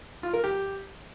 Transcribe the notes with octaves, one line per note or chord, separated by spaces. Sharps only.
F4
A#4
G4